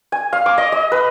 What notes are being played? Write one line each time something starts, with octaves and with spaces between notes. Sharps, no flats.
G#5
F5
D6
D#5
D#5
B4